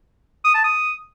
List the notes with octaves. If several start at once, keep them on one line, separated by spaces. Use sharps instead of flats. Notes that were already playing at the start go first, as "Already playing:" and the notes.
D#6
A5
D#6